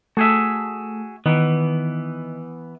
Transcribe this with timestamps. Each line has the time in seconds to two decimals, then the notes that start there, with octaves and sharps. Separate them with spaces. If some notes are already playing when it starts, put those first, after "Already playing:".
0.17 A3 F#4 G#4 E5
1.26 D#3 E3 B3